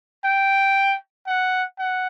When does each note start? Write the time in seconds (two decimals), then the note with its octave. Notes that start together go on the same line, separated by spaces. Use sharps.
0.24 G5
1.27 F#5
1.78 F#5